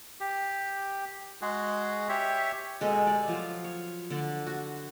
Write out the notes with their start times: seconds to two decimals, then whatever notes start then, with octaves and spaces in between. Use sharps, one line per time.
0.20 G4
1.42 G#3 F#4 G#4
2.09 G4 C#5 E5
2.81 B2 G#3 G#4 A4
3.07 G4 D5
3.28 F3 F#3 F4
3.64 C#5
4.10 D3 A4 D5
4.46 F#4